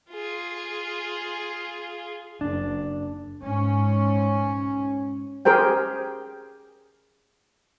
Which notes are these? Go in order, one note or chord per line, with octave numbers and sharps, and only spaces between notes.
F4 G#4
F#1 D4
G#2 C#4
G4 G#4 A#4 C5 G5